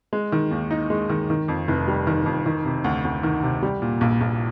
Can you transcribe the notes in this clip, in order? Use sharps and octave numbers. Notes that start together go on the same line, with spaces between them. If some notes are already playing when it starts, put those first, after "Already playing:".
G#3
D#3
D#2
D#4
G#3
D#3
D#3
F2
F1
G3
D#3
F2
D#3
C3
D2
D2
D#3
C3
G3
A#2
A#1
A#1